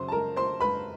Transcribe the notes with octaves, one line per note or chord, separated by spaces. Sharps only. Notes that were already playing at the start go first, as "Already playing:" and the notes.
Already playing: F#2 C#3 F#3 C5 C6
A5
A#4 A#5
C5 C6
B4 B5